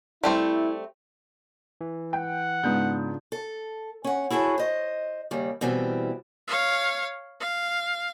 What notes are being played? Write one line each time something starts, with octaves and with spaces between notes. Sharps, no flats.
G3 A3 C4 E4
E3
F#5 G5
G#2 C#3 B3 D4 F4 G6
A4
C#4 F#5
E4 F#4 G#4 A4 C#5
C5 D#5
D#2 C#3 G3
B2 E3 G3 C4
C#5 F5
F5